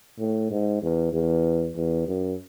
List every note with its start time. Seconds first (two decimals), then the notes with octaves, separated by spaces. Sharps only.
0.19 A2
0.51 G#2
0.82 E2
1.13 E2
1.76 E2
2.08 F#2